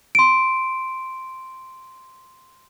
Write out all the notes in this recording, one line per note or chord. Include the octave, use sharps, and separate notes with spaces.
C6 D7